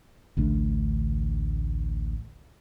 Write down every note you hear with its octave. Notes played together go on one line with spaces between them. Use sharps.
A1 D2 A3 D4